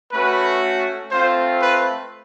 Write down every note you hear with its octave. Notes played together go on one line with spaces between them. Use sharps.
A3 C#4 F#4 B4
A3 C4 F4 C5
B4